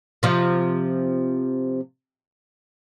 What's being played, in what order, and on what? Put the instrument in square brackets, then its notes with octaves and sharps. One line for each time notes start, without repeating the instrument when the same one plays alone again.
[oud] C3 F3